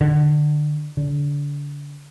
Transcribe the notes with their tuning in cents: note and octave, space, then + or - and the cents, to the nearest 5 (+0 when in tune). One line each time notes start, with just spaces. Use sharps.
D3 +25
D3 -30